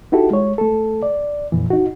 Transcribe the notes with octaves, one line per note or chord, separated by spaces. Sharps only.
D#4 E4 F#4 G4 A4
G#3 C#5
A3 A4
D5
F2 A#2 E3
D#4 F#4